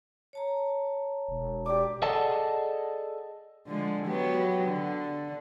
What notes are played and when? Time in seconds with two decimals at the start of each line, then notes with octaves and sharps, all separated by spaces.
0.33 C#5 A5 A#5
1.29 E1
1.66 G4 D5 D6
2.02 G#4 A4 D5 D#5 F#5 A5
3.67 D3 F3 G#3
4.07 F#3 B3 G4
4.64 D3